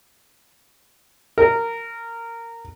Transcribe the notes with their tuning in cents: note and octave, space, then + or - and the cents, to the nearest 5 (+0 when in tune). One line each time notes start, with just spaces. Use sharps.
A#4 -15